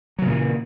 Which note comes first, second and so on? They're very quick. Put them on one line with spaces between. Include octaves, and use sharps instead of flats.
F#3 C#3 A#2 E3